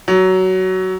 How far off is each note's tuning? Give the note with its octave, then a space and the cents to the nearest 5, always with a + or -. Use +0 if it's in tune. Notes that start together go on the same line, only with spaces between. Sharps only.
F#3 +15